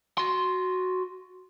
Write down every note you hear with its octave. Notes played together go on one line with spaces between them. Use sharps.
F#4 C6